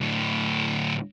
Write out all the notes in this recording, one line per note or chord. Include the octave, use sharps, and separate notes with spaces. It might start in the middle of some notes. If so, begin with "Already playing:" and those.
D2 A2